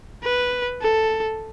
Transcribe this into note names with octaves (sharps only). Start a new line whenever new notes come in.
B4
A4